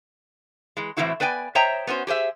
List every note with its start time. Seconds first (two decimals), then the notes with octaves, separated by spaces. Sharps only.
0.77 E3 G#3
0.97 A2 E3 F#3 C4 E4 F#4
1.20 B3 B4 D5 G5 G#5
1.55 C5 C#5 D#5 E5 G5 A#5
1.87 B3 C#4 F#4 C5
2.07 G4 G#4 C5 E5